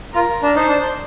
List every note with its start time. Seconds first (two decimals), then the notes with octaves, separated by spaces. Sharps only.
0.14 F4 A#4
0.43 D4
0.55 D#4 C5
0.68 D4